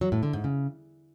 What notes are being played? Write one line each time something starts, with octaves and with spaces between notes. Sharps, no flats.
F#3
A2
D3
G#2
C#3